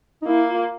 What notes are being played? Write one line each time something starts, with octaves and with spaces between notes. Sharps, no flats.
D#4
A#3 E4
F4